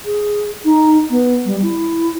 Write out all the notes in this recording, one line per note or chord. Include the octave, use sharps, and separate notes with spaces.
G#4
D#4
B3
G3
E4